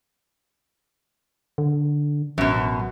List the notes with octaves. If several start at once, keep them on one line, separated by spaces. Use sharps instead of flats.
D3
A1 F#2 B2